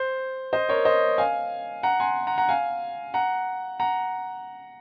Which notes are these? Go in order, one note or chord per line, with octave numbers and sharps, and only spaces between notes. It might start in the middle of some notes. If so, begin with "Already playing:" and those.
Already playing: C5
C5 D#5
A#4 C#5
C5 D#5
F5 G#5
F#5 A#5
G#5 C6
F#5 A#5
F#5 A#5
F5 G#5
F#5 A#5
F#5 A#5